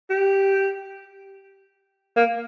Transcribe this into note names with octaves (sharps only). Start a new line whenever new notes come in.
G4
A#3